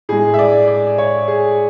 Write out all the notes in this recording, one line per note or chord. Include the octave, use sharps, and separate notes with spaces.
A2 G#3 G#4
E5
D5
D5
C#5
G#4